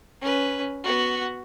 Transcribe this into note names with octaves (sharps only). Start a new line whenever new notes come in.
C#4 B4
B3 F#4